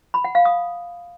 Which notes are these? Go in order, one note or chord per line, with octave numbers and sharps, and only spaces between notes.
B5
F#5
F5
D#6